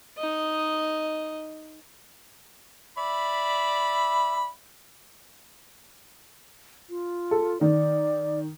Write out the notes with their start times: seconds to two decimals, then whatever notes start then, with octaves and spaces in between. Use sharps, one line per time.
0.18 D#4 D#5
2.98 D5 E5 B5
6.90 F4
7.31 A4
7.61 D#3 D5